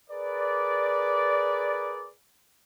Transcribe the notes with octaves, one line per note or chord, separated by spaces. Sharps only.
G#4 A#4 B4 D5